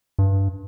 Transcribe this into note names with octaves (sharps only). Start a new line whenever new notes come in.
G2